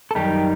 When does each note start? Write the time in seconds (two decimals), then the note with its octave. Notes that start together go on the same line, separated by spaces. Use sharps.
0.11 A4
0.15 F#2 D#3 G3 D#4 G4